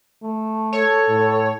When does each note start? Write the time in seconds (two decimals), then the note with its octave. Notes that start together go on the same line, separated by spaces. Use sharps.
0.22 A3
0.73 A4 C#5
1.08 A2